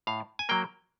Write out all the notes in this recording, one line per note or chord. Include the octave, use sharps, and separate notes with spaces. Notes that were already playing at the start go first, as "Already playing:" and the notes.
A2 F5
G#5
F#3 A#3 G5